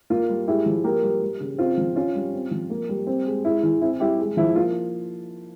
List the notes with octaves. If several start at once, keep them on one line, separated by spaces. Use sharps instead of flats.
A#3 F4
G3
G#3 E4 G4
F3
A#3 G4 A#4
G3
G3
C#3
C4 F4
F3
C#4 F4
G3
C4
F3
A#3
G3
C4
G#3
G#3 E4
E3
C4 E4
G3 E4 G4
G#3
F3 E4
A#3 F4